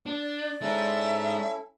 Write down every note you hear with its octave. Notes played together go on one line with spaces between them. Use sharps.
D4 D5
G#3 C#4 D#4 E4 A4 E5